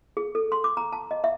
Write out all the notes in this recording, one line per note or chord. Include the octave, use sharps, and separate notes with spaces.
G#4
A4
C6
D6
A#5
A5
D#5
E5